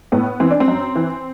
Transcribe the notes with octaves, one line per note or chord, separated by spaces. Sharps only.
A2 B3
E3 C4
D4
C4
F#2
E3